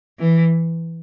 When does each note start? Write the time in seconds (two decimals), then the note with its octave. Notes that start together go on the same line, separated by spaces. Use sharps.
0.19 E3